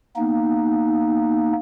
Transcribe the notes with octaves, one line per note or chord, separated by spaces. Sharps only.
A#3 B3 D#4